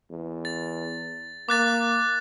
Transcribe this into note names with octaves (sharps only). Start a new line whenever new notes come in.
E2
A6
A#3 D6 F#6 A6